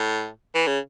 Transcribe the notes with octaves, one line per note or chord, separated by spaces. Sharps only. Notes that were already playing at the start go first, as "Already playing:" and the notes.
Already playing: A2
E3
C#3